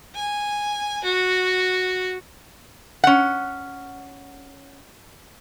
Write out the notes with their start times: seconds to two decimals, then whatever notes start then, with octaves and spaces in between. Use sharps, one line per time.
0.15 G#5
1.04 F#4
3.04 C#4 F#5